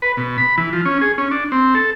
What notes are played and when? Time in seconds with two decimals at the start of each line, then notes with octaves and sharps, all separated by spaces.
0.02 B4
0.17 B2
0.38 B5
0.58 E3
0.73 F3
0.85 C#4
1.01 G#4
1.18 C#4
1.31 D4
1.52 C4
1.75 A4